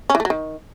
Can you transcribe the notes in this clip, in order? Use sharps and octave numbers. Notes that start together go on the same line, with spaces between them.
C#4
E3
A3
F#3
D#3